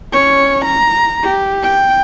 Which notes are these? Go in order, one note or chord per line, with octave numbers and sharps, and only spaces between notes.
C#4 C#5
A#5
G4
G5